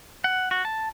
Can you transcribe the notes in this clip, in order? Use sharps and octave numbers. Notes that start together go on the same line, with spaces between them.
F#5
F#4
A5